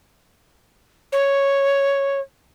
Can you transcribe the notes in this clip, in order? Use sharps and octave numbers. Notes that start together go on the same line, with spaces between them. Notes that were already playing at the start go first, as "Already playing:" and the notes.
C#5